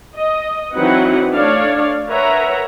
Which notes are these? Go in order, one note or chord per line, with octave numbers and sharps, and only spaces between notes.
D#5
E3 F#3 C4 D#4 B4 F#5
A3 D4 C#5 D5 F5
A#4 B4 C#5 E5 F#5 A#5